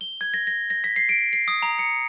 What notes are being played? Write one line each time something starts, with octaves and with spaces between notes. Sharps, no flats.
G7
G#6
A#6
A#6
A#6
B6
C7
D7
C7
D#6
A#5
C#7